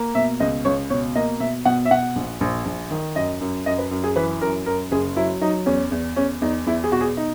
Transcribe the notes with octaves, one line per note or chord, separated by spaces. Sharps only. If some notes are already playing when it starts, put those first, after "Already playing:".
Already playing: A#3
B2 E5
C#2 D#5
C#2 C#5
B2 C#5
A#3 D#5
B2 E5
B2 F#5
E5
B2 F#5
A#1
A#1
A#1
D#3
F#2 D#5
F#2
F#2 D#5
B4
F#2
G#4
E3 B4
F#2 A#4
F#2 A#4
F#1 G#4
F#3 E4
F#3 D#4
E2 C#4
E2
E2 C#4
E2 D#4
E2 E4
G#4
B2 F#4
G#4
D#4